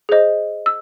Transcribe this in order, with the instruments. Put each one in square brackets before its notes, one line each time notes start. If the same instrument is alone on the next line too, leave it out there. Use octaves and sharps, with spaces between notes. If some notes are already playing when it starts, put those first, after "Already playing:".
[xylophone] G#4 C5 D#5
E6